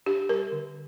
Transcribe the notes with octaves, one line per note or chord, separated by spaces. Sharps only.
D4 G4
G3 A#4
D3